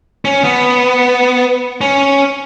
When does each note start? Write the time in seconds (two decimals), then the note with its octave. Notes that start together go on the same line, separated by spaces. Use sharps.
0.25 C#4
0.44 B3
1.81 C#4